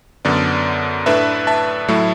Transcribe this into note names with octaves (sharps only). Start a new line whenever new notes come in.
F#2 D3 B3 A4 D5
A2 A3 D4 B4 E5
E5 A5
A2 F#3 A3 E4